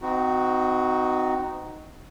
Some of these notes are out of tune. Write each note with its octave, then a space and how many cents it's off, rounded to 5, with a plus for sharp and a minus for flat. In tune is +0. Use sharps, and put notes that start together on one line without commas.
C4 -35 D#4 +0 F#4 +0